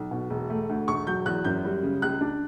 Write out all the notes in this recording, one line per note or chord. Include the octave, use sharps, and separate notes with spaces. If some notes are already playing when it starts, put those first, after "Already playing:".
Already playing: B1
B2
E1
A3
D2
E1 C#6
F#3 G6
E2 F#6
F#2 G6
G3
C#3
C#2 F#6
D4